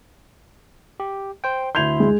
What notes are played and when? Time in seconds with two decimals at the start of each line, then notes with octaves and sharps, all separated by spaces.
1.00 G4
1.44 C5 G5
1.75 D2 E4 C6 G6 G#6 F7
2.00 G#3